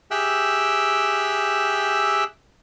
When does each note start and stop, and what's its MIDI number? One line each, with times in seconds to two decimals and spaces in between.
0.11 2.24 67
0.11 2.24 68
0.11 2.24 76
0.11 2.24 79
0.11 2.24 88
0.11 2.24 90